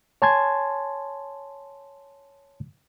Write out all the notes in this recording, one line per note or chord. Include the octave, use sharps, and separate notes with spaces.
C#5 G#5 A5 C6 G#6